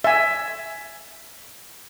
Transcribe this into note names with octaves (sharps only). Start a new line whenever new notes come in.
E5 G#5